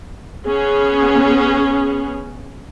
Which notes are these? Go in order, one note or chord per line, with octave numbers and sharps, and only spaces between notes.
B3 C#4 G#4